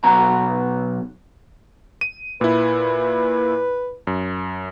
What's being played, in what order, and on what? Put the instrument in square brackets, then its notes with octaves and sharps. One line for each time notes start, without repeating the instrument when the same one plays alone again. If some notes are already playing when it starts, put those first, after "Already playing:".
[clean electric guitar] B1 B2 F#4 A#5
[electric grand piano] D#7
[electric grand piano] A#2 E4 [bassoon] B4
[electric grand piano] F#2